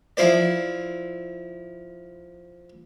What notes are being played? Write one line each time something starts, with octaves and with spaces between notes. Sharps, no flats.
F3 E4 C5 D5